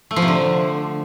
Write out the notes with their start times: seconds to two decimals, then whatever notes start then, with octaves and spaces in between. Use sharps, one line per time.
0.11 A3
0.16 F3
0.22 C3
0.28 D3